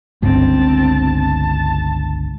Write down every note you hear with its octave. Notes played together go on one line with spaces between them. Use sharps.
G1 C#2 G2 C4 A5
A5